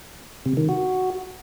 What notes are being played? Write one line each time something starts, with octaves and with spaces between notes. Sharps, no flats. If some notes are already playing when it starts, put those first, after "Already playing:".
C3
D#3
F#4